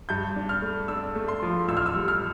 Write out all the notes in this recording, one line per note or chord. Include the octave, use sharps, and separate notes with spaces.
G2 G6
D4
F6
A3
D4 E6
A3
C6
F3
A1 E6
F6
E6
G3
F6